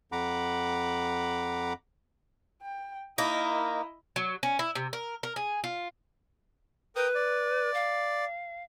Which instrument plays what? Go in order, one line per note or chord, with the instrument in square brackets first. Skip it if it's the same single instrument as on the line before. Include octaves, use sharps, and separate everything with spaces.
[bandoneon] F2 F#5 A#5 B5 D6
[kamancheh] G5
[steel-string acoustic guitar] A#3 D#4 A#4 [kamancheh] E4 D#5
[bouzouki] F#3
C#4
E4
C3
A#4
A#4
G#4
F4
[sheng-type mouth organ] A#4 G5 D#6 [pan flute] B4
[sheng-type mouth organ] D5
[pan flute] F5